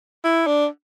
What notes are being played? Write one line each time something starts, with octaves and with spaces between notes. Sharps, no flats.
E4
D4